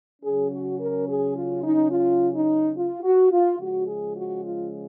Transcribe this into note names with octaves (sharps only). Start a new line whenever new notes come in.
C#3 F#3 C#4 G#4
F#4
A#4
G#4
F4
D#4
F4
D#4
F4
F#4
F4
C#3 F3 G#3 C#4 F#4
G#4
F#4
F4